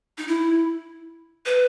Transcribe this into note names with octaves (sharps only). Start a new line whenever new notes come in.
D#4
E4
B4